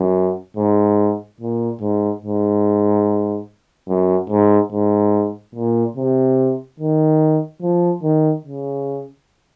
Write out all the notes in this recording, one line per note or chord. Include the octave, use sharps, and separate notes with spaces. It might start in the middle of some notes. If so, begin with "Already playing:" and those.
Already playing: F#2
G#2
A#2
G#2
G#2
F#2
G#2
G#2
A#2
C3
D#3
F3
D#3
C#3